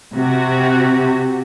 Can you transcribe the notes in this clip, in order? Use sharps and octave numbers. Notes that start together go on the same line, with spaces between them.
C3 F#4